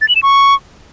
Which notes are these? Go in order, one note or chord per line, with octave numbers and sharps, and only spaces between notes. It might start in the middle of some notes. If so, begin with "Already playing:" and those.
A6
F#7
E7
C#6